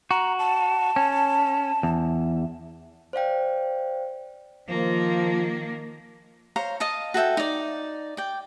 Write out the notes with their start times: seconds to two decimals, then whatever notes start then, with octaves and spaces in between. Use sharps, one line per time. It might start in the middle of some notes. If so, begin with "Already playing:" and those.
0.11 F#4 A#5
0.39 A5
0.96 C#4
1.83 E2
3.13 C5 D5 F5 G5
4.69 D#3 F3 A#3
6.56 C5 C#5 F5 A#5
6.80 D#5 F5 A5
7.14 F#4 A4 E5 G5
7.37 D#4 D5
8.17 D5 G5